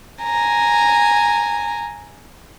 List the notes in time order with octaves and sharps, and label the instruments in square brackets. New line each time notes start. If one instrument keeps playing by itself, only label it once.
[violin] G#5 A#5